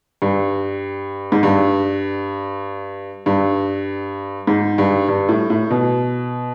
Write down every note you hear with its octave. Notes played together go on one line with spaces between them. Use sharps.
G2
G#2
G2
G2
G#2
G2
G2
A2
A2
B2